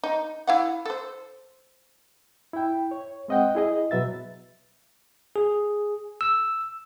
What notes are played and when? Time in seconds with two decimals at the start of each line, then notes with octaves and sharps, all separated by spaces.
0.04 D#4
0.47 E4 F5 F#5
0.85 A4 C5
2.53 E4 G5
2.91 C#5
3.28 G#3 C4 D#5 F#5 G5
3.55 E4 G#4 D#5
3.91 B2 F#3 B4 E5 A6
5.36 G#4
6.21 E6